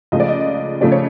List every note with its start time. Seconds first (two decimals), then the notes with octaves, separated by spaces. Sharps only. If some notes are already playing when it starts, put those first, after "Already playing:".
0.12 C#2 C#3 F3 A3 D#5
0.20 D5
0.28 D#5
0.81 C#3 F3 A3 D5
0.92 C#5